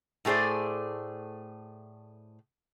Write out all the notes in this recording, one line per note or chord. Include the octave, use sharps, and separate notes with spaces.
A2 A3 G#4 C5 D5